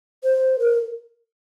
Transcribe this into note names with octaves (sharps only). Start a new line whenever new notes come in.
C5
A#4